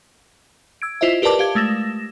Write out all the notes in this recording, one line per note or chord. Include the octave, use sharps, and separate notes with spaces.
E6 G#6 D7
E4 F4 C5 D#5 E5
G4 A#4 B4 D5 A5 D6
G4 F5 G#6
G#3 A3 A#6 E7